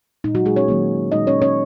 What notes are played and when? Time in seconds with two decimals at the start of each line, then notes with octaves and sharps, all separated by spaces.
0.24 A#2 G#3 D#4
0.35 F#3 F#4
0.46 G#3 G#4
0.56 C#4 C#5
0.68 D#3 F#3 A#3
1.12 A#2 G#3 D#4 D#5
1.27 C#4 C#5
1.42 C#4 C#5